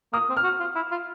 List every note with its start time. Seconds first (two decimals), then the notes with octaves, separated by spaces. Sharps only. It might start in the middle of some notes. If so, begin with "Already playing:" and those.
0.13 A#3 D#6
0.30 C4
0.37 F6
0.44 F#4
0.60 F4
0.76 E4
0.92 F4